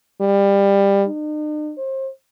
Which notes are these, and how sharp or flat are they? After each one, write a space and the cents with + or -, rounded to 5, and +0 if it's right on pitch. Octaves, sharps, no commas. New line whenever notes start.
G3 +20
D#4 -45
C5 +35